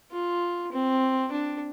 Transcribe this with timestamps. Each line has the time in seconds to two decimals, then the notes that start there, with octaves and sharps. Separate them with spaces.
0.12 F4
0.72 C4
1.32 D4